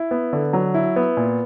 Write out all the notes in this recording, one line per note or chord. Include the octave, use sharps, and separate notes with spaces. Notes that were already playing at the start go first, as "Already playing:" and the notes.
Already playing: E4
B3
D3
F#3
E4
B3
A#2